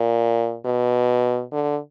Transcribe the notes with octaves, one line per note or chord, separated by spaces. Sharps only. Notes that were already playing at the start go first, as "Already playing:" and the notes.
Already playing: A#2
B2
D3